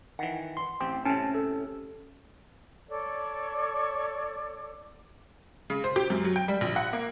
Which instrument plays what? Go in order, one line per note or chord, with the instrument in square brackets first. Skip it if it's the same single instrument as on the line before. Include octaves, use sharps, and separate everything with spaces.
[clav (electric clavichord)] D#3 E3 [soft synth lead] F#5
[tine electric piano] C6
[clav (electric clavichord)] A1 C4 G4
[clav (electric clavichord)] A2 C3 [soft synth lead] C#4 [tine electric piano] A5
[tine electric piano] A4
[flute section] A4 C#5 D5
[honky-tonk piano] C#3
C5
G4
F#2
F#3
G5
G3
A#1
F#5
A#3